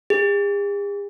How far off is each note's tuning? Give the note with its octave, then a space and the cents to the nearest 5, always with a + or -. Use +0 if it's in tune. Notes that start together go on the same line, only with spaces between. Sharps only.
G#4 -45